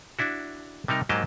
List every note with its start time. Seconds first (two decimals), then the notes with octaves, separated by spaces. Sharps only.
0.19 D4 E4 F#4
0.88 C3 G3 D#4 A#4
1.09 G#2 F#3 A#3 G4 D#5 A5